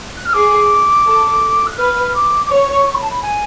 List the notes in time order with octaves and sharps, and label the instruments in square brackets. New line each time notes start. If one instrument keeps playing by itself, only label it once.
[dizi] F#6
F6
[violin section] G#4 [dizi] D6
[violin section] A4
[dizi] F#6
[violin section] B4 [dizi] F6
[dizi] D6
D6
[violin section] C#5 [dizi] C#6
[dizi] C#6
B5
A5
B5
G#5